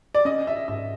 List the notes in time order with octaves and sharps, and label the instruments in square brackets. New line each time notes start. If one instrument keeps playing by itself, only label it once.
[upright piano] D5
[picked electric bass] C#4 [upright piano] D#5
[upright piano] E5
[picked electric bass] G#2 [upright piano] E5